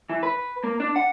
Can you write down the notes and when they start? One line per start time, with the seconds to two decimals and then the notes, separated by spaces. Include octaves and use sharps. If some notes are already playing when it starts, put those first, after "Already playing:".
0.10 E3
0.23 B4
0.64 A#3
0.80 D4
0.96 F#5